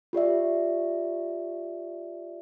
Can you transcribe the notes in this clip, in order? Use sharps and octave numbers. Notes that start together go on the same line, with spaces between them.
F4 G4 D5 E5